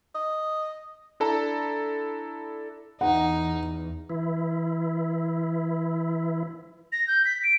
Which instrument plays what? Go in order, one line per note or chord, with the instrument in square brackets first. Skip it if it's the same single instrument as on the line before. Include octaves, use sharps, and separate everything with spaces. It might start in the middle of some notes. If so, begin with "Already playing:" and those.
[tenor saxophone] D#5
[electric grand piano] D4 E4 A4 A5 A#5
[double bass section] E2 [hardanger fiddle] D#4 [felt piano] F#5
[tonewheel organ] E3 E4
[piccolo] A#6
G6
B6
D7